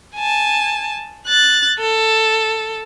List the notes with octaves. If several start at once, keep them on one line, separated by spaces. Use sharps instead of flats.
G#5 A5
F#6 A6
A4